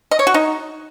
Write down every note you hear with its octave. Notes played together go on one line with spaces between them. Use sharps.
D#5
C#5
F#4
D#4